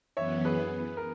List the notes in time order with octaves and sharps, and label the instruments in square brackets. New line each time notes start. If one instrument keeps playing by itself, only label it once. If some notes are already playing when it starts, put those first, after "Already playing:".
[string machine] F#2 E3 B3 [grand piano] C#5 E5
[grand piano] G#4 B4
A#4